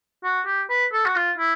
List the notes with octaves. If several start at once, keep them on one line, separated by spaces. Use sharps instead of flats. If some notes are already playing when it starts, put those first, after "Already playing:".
F#4
G4
B4
A4
F#4
F4
E4